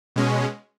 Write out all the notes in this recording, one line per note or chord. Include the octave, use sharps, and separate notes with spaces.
B2 G#3 C#4